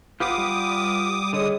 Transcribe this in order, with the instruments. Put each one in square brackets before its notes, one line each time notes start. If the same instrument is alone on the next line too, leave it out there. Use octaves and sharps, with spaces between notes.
[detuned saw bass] G1 [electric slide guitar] F4 G4 B4 [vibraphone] F#5 [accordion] D6 D#6
[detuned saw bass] G3
[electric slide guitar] D3 [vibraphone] G#4 C#5 D#5 [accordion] D#6